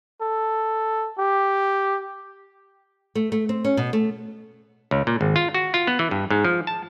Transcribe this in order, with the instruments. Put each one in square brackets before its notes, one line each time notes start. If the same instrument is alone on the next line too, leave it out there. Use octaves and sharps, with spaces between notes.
[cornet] A4
G4
[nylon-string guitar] A3
A3
C4
C#4
B2
A3
[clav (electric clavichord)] C#2
A#2
G#1
F4
F#4
F4
B3
E3
G2
G#2
F3
A5